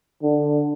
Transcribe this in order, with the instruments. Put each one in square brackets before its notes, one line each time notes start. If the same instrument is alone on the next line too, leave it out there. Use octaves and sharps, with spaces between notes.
[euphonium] D3